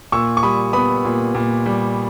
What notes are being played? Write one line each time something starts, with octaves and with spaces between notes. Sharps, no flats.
A#2 C#6 E6
C#6
G3 B5 D#6
B3 B5 D#6
A#2
A#2
G3